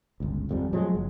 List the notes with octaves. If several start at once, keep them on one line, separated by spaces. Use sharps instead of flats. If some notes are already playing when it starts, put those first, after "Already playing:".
G1 C#2
G#1 F2 G3
F3 F#3 G#3 A3
F#1